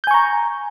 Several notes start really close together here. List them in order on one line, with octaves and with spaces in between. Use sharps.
G6 G#5 C#6 A#5